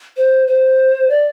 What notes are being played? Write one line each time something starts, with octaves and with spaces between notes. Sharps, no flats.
C5
C5
D5